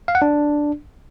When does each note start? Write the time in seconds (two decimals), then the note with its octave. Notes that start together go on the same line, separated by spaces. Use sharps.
0.08 F5
0.15 F#5
0.22 D4